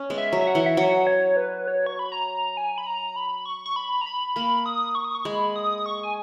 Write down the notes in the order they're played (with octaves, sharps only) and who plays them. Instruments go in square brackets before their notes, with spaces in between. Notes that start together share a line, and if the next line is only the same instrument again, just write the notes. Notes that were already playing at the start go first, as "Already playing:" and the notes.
Already playing: [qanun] C#4
G#3 B3
[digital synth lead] E5
[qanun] F#3
[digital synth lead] E5
F#5
[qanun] E3
[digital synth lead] E5
[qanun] F#3 [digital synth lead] F#5
[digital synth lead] C#5
B4
C#5
C#6
B5
A#5
G#5
B5
A#5
B5
C#6
C#6
B5
A#5
B5
[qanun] A#3 [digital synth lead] B5
[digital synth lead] D#6
C#6
D#6
C#6
[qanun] G#3 [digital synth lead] B5
[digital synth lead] D#6
C#6
G#5